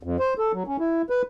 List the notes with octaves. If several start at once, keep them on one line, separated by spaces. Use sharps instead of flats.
F2
C5
A4
F#3
C#4
E4
B4